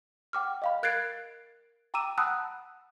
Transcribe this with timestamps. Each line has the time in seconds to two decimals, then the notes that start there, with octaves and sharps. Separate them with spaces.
0.33 F#5 G5 D6 F6
0.62 D#5 F5 B5
0.83 A#4 F#6 G#6 A6 C7 D7
1.94 G5 A#5 D6 E6 D#7 E7
2.18 F#5 A5 B5 D#6 E6 F#6